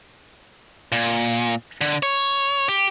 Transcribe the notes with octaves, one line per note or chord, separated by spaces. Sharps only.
A#2
D3
C#5
G4